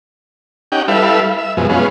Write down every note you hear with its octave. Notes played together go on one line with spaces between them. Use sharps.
C#4 D#4 G4 F#5 G5
G3 E4 A4 B4 E5 F5
E5
F#2 B2 F3 G#3
G#3 B3 C#4 F4